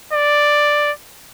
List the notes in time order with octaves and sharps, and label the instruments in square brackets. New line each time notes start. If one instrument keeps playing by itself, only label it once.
[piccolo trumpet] D5